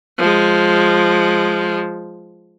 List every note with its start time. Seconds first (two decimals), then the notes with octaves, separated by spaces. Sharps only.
0.18 F3 G#3